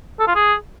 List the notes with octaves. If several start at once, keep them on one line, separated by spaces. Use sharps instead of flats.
A4
F4
G#4